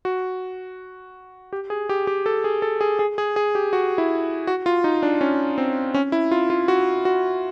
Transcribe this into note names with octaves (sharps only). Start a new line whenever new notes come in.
F#4
G4
G#4
G4
G4
A4
G#4
A4
G#4
G#4
G#4
G#4
G4
F#4
E4
F#4
F4
D#4
D4
C#4
C4
C#4
E4
F4
F4
F#4
F#4